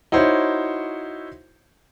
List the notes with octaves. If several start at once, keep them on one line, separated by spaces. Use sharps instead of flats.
D#4 E4 F#4 C5 C#5